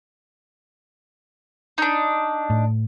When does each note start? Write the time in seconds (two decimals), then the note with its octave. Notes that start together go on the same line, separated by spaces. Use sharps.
1.78 D4 D#4
2.50 A2